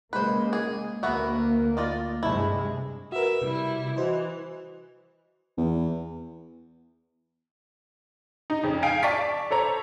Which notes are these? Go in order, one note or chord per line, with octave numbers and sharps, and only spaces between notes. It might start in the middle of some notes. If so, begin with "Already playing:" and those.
C#3 G#3 A#3 B4 C5
G#4
D2 A#3 B3 F#4 E5
F4 D5 D#5
G2 C3 G#3 A3 E4
F#4 A#4 B4 E5
C3 G3 E4
E3 F#4 C5 D#5
E2
D#4
F2 C#3
F5 G5 G#5 D7
D5 A5 C#6 D6 A6 B6
A4 C5 C#5 A#5